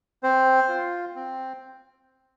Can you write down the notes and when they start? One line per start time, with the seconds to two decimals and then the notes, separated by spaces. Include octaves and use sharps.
0.23 C4 C5
0.69 F4
1.16 C4